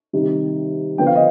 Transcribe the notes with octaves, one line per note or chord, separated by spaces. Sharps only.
C3 D#3 G3
D3 F3 B3 D4 G5
F5
D#5